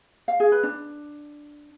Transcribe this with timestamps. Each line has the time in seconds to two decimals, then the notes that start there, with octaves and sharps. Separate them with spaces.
0.28 F5
0.40 G#4
0.52 B4
0.63 D4